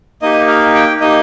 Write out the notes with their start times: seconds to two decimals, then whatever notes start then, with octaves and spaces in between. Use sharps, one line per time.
0.22 A#3 D#4 G4 D#5
0.48 F5
0.75 G5
1.00 A#3 D#4 G4 D#5